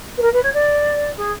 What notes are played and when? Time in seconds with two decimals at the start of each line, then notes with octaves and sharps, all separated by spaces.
0.17 B4
0.21 A#4
0.33 B4
0.42 C#5
0.53 D5
1.17 G#4